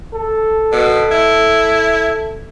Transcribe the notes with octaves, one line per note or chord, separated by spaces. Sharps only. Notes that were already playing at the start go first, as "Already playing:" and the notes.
A4
B2
E4